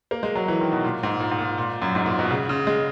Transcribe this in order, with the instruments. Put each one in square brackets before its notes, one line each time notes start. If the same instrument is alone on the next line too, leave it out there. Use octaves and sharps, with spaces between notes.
[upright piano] A#3
G#3
F#3
E3
D#3
B2
A#2
G#2
A#2
G#2
A#2
A#2
F#2
G#2
A#2
B2
C#3
C#3
G#3